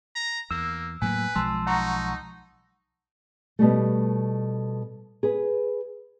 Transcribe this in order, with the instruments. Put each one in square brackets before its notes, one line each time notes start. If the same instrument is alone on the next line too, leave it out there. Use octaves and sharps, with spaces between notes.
[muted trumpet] A#5
[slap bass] E2 [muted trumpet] A#3 [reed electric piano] E6
[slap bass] A2 F#3 A#3 [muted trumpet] B4 [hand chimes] G#5
[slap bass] B1 F3 G#3 [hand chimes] A5 C6 E6
[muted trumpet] D#4 [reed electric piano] F#5 A#5 C#6
[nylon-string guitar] B2 G3 A3
G#4 B4